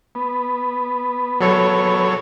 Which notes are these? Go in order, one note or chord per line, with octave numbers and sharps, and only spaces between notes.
B3
F#3 A4 C#5